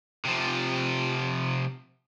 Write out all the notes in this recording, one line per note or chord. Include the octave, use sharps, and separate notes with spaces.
C3 F3